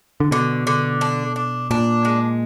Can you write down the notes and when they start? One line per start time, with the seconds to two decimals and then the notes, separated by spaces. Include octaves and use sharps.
0.20 D3
0.31 B2 D3
0.67 D3
1.01 D4
1.36 D4
1.71 A#2 D4
2.05 G#3